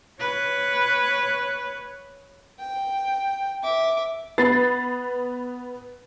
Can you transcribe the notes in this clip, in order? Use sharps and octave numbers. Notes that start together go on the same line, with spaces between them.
B4 C#5
G5
E5 D6
B3 B5 A6 C7